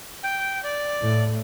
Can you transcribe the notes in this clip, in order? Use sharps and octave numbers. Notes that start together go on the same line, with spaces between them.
G5
D5
A2